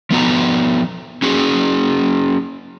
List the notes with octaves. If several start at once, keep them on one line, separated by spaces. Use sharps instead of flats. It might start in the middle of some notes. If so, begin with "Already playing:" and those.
F3 B3 F#4 A#5
C#4 F#4 G#4